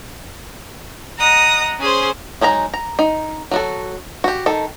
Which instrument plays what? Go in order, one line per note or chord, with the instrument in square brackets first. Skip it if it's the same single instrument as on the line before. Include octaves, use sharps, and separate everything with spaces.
[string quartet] D#5 F#5 A#5 D#6
C#4 G#4 C5
[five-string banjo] F#3 G#3 D#4 A#5
A#5
D#4
F#3 F#4 A4
F#4 G4
D#3 A4